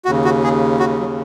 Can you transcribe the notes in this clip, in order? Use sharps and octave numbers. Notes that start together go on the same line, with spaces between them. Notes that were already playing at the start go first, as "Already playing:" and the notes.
D#2 C#3 F#4
F#4
G#4
F#4
F#3